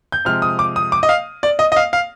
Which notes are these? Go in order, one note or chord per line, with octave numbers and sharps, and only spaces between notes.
G6
C3 F3 G#3 F6
D#6
D6
D#6
D6
D#5
F5
D5
D#5
D#5
F5
F5